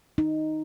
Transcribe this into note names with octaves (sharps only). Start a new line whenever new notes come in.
D#4